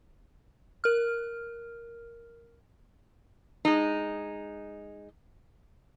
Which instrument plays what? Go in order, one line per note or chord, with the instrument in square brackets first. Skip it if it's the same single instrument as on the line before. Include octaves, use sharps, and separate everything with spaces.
[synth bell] A#4 F6
[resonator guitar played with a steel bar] G#3 D#4